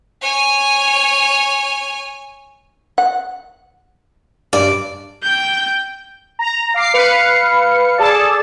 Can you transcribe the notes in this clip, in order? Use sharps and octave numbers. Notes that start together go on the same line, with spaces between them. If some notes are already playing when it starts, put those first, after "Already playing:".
C#5 G#5
F#5
G2 D5
G5 G6
A#5
F5 D6 C7
B4 F5 C#7
G#4 A4 D5 A5